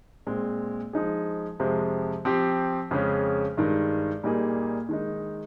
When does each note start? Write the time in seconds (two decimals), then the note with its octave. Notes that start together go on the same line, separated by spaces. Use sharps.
0.27 A#2 G#3 C4
0.93 F3 G#3 D#4 G#4
1.60 F2 C3 F3 G#3
2.25 F3 C4 G4
2.91 F2 C#3 G#3 C#4
3.57 G2 D#3 G#3
4.23 A#2 G3 A#3 D#4 G#4
4.89 D#3 G#3 D#4